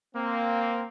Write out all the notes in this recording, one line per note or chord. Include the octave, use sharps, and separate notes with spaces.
A#3 C4